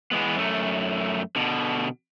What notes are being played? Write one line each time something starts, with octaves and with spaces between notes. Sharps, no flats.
E3 G#3 B3
F#2 A3
B2 D3